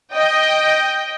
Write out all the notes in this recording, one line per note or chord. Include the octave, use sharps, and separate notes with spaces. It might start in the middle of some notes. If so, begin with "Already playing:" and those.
D#5 G5